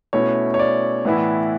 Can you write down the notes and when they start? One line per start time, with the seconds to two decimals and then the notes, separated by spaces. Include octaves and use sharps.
0.13 B2 A3 C#4 E4 C#5
0.54 C#5
0.59 D5
1.05 A2 E3 B3 E4